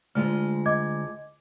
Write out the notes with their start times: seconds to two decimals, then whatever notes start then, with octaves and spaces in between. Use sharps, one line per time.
0.15 D2 G#3 F4 F6
0.66 D#5 D6 G#6